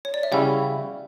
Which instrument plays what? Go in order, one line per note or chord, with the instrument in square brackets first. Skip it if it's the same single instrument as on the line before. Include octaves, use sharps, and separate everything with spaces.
[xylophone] C#5
D5
E5
[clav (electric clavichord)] C#3 G3 C#4 E4 [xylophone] F#5